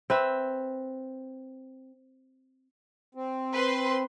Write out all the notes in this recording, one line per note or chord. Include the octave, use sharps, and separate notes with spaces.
C4 B4 E5
C4
B4 C5 C6